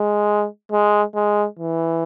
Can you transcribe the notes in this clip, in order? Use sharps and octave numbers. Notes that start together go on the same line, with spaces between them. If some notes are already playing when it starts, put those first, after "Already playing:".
Already playing: G#3
G#3
G#3
E3